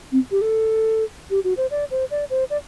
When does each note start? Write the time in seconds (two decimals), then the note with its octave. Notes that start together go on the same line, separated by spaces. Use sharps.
0.12 C4
0.31 G4
0.41 A4
1.30 G4
1.44 F#4
1.57 C5
1.71 D5
1.91 C5
2.11 D5
2.30 C5
2.50 D5